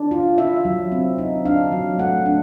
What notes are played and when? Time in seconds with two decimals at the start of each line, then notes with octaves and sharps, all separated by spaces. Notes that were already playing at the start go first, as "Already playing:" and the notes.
Already playing: D4
0.11 F4
0.38 E4 E5
0.65 F#3
0.92 C4
1.18 D#4
1.45 D4 F5
1.72 F#3
1.98 A3 F#5
2.26 D4